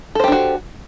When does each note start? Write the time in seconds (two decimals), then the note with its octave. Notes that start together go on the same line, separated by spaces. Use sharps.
0.15 A4
0.20 C5
0.24 G4
0.28 D4
0.32 F#4